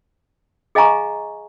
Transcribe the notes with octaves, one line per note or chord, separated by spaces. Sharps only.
G#4 D#5 F5 G#5 A#5 C#6